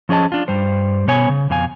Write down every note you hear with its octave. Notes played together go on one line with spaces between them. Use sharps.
F3 C#4 G#4 D#5 A5
D4 F4
G2 G3 C5
B2 B3 C#5 G#5
C#3
F2 B2 F5 G#5